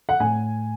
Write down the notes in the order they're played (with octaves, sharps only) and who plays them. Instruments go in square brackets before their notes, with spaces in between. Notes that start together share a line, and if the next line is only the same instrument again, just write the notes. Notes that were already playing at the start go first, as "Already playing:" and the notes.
[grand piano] F#5
A2 G#5